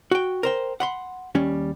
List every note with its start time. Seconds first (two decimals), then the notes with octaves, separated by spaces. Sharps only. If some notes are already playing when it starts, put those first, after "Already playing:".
0.11 F#4 G5
0.43 A#4 C5 G5
0.80 F#5 B5 C6
1.35 D#2 G3 C#4